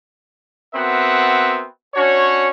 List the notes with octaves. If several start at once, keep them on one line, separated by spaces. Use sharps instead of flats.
B3 C4 F#4 A#4 E5 F#5
C#4 D4 F#4 C#5